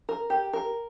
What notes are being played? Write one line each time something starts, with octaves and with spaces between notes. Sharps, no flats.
A#4
G4
A#4